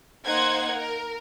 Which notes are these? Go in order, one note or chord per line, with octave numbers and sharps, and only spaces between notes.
A#3 D#4 C5 F#5 G#6
A#4